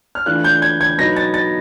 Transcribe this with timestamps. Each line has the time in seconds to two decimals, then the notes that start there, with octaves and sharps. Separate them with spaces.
0.15 F6
0.26 E3 A3 D4 F4 F#6
0.44 G6
0.62 G#6
0.81 G#6
0.98 B2 F#3 B3 D#4 A#6
1.17 A6
1.34 A6